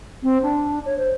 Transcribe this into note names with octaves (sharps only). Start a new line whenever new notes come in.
C4
D4
C#5
C5